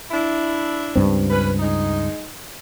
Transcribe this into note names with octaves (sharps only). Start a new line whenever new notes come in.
D4 E4
C#2 G2 C4
C#4 B4
G#3 D#4